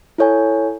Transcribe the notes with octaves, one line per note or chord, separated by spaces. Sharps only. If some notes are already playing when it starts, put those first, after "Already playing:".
E4 A4 C#5 G#5